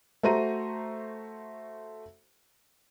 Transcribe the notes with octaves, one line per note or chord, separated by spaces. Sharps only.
A3 F#4 C5 A#5 D#7